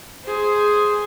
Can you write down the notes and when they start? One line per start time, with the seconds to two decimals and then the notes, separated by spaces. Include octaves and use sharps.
0.25 G#4 C5